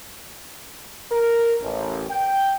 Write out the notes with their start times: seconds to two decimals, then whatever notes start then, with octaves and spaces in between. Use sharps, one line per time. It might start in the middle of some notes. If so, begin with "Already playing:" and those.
1.11 A#4
1.62 A1
2.10 G5